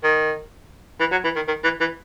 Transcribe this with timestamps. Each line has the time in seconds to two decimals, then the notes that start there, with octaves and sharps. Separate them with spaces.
0.03 D#3
1.00 E3
1.11 F#3
1.24 E3
1.36 D#3
1.48 D#3
1.64 E3
1.80 E3